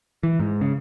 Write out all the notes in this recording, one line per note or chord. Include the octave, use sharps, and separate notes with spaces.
E3
G#2
C#3